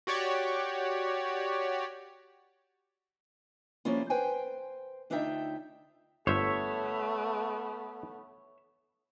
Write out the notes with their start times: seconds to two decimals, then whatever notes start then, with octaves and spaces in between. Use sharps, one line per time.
0.07 F#4 G4 C#5 D5
3.85 F3 G3 A#3 C#4 E4 F4
4.10 B4 C5 G5 G#5
5.10 D2 D4 D#4 F4 E5 G5
6.27 G1 A3 B3 C5 C#5 E5